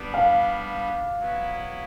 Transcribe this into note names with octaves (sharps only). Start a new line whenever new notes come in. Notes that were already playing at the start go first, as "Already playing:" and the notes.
Already playing: G3 B3 D4
F5
F#3 B3 E4